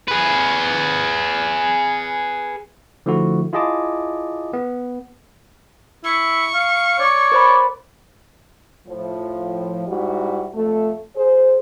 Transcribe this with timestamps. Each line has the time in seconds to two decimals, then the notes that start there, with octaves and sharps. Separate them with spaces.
0.08 G#4 B4
3.06 D3 F3 A3 E4 F#4
3.53 E4 F4 G#4 D#5 A5 D6
4.53 B3
6.05 E4 C#6
6.54 F5
6.99 C#5 D5
7.32 A#4 C5 B5
8.87 A2 F3
9.87 G#2 G3 E4 F#4
10.54 F2 A3
11.16 G#4 C5